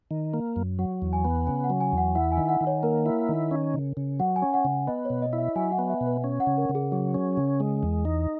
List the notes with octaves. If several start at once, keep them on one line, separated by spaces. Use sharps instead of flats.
D#3
A#3
F#2
F#3 F#5
E2
G#5
B3
C#3 G#5
F#5
F#3
G#5
E2
F#5
E4 F#5
G#5
D#3
F#5
D#3
C#5
A#3 A#4
E4
D#3
C#4
C#3
C#3
F#3 F#5
G#5
C#4
F#5
C#3
B3 D#5
B2 C#5
D#5
E4
E5
F#3 G#5
F#5
B3
E5
B2
B4
C#4
F#5
C#3
A#4
C#3
G#4
F#3 G#4
C#4
C#3
G#3
E2
D#4